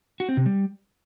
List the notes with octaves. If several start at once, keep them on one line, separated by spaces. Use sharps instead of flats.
F#4
C4
C3
G3